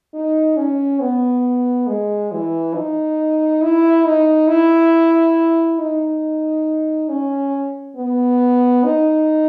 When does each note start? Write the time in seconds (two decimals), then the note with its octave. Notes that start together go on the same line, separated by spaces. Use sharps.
0.14 D#4
0.57 C#4
1.00 B3
1.87 G#3
2.32 E3
2.74 D#4
3.62 E4
4.05 D#4
4.48 E4
5.79 D#4
7.09 C#4
7.96 B3
8.84 D#4